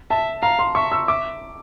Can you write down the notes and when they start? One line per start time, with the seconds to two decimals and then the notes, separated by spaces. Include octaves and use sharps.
0.10 E5 A5
0.42 F5 A#5
0.59 C6
0.75 E5 C#6
0.92 E6
1.08 E5 D6